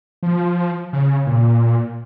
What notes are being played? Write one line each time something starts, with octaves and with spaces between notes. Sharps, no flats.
F3
C#3
A#2